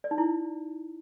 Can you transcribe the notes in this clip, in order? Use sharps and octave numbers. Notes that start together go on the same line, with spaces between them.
D5
D#4
E4